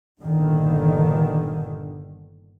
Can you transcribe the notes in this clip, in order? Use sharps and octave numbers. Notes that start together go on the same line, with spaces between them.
G1 G2 A#2 D3 D#3